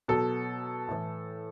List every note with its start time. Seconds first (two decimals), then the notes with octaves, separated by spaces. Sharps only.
0.08 B2 F#3 A4
0.88 A2 E3